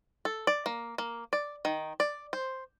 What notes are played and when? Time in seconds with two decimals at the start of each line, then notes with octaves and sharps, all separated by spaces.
0.25 A4
0.47 D5
0.66 A#3
0.98 A#3
1.33 D5
1.65 D#3
2.00 D5
2.33 C5